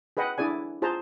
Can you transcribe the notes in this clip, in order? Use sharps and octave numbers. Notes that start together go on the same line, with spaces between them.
G#4 B4 D#5 F#5 G5
D4 E4 G#4 D5 G#5
F4 G#4 C5 A5 A#5